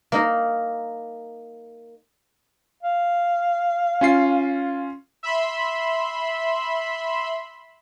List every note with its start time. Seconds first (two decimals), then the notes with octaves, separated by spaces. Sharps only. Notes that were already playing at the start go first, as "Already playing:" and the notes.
0.12 A#3 D#4 A#4
2.83 F5
4.01 C#4 F4 C7
5.23 E5 B5 C6